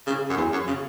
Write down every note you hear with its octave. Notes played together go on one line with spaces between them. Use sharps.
C#3
F#2
E2
F#2
C#3